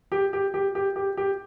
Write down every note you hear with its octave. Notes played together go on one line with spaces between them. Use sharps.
G4
G4
G4
G4
G4
G4